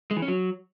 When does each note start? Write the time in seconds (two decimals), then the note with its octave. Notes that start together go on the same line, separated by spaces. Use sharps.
0.11 G#3
0.17 E3
0.22 C#4
0.28 F#3